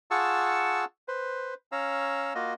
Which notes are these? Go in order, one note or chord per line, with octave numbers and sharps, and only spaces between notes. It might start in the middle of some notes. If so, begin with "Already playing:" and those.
F4 G#4 F#5 A5 C#6 E6
B4 C5
C#4 C#5 F5 A#5 E6
A#3 F4 F#4 D#5